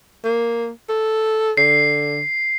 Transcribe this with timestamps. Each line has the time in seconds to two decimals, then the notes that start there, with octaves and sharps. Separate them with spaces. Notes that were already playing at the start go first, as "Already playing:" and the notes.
0.24 A#3
0.89 A4
1.57 D3 C7